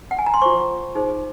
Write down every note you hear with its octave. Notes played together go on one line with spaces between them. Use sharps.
F#5
G#5
A#5
C6
F4 C5 C#6
D#4 G#4 C5